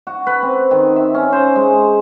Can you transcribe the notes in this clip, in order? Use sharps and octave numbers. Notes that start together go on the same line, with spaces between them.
F#4
B4
C4
D#3
E5
C#4
C5
G#3